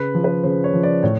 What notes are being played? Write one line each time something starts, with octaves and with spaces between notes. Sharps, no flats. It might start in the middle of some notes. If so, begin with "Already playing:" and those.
Already playing: C#3 B4
F3
B4
C#3 C5
C#5
F3
D5
A2 C#5